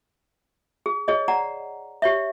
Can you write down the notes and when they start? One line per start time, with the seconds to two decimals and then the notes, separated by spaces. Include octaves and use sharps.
0.86 G#4
1.08 G#4 C#5 D#5
1.28 D5 F#5 A#5
2.02 G4 C#5 E5